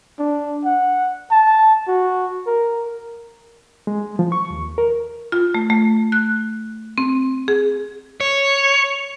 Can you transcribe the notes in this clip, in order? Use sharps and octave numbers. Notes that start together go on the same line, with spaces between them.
D4
F#5
A5
F#4
A#4
G#3
F3
C#6
D#2
A#4
F4
A3
A3
F#6
C4
G#4
C#5